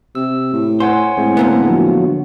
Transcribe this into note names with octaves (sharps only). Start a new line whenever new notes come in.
C3 E6
A2
C5 C#5 F#5 G#5
A2 G#3 C4
D3 A#3 B3
F3 F#3